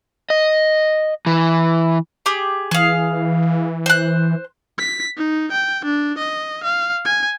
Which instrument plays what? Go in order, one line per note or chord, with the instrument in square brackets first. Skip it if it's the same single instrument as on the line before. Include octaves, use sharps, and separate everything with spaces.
[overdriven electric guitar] D#5
E3
[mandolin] G4 G#4
[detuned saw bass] E3 [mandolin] G#4 F5
[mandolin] C5 F#6
[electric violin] B6
D#4
G5
D4
D#5
F5
G#5